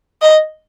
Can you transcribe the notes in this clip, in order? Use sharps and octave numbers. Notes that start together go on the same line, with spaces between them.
D#5